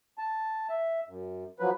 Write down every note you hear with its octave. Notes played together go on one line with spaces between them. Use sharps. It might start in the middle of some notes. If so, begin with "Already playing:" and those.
A5
E5
F#2
F3 F#3 B4